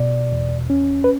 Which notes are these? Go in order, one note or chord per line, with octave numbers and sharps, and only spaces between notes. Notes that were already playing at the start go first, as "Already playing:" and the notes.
Already playing: B2 D5
E2
C#4
B4